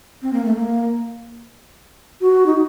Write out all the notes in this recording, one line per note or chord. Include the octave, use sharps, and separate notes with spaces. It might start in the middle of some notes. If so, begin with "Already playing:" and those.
C4
A#3
A3
A#3
F#4
D#4